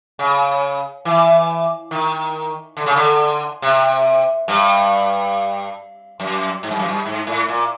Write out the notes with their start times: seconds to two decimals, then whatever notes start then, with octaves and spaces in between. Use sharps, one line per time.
0.19 C#3
1.05 E3
1.91 D#3
2.77 D3
2.86 C#3
2.96 D3
3.62 C3
4.48 G2
6.20 F#2
6.63 G#2
6.71 G2
6.79 F#2
6.88 G2
7.06 G#2
7.27 A2
7.48 A#2